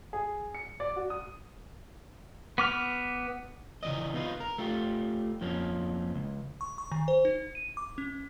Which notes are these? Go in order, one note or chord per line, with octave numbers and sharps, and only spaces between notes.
G#4
C#7
D5
F#4
D#6
B3 D6 F6
C#3 E3 B3 D5 D#5
B3 D#4 F4 B4
A#4
A3 F4 G4
F2 F3 A#3 C#4
C#2
C#6
C#6
D#3
C5
D#4
D#7
D6
C#4